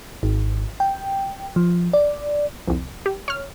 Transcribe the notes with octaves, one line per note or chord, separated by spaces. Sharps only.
G#1
G5
F3
D5
C2 F2
G4
C#5 F6